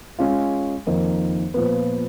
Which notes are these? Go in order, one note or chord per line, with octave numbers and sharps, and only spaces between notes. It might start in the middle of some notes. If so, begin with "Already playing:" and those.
G#3 C#4 F4
F2 D#3 A#3 D#4
A#2 F3 B3